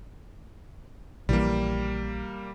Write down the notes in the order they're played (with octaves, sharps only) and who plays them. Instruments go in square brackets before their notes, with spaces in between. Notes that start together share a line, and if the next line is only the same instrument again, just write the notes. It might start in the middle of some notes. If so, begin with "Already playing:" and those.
[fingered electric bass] A#1 E3 [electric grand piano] G3 A#3